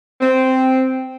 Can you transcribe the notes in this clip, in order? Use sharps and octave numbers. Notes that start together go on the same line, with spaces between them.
C4